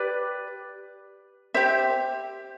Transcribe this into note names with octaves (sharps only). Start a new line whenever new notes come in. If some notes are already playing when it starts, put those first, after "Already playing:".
Already playing: G4 B4 D5
G4 C5 E5